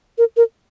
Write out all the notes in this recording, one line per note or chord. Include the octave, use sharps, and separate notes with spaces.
A#4
A#4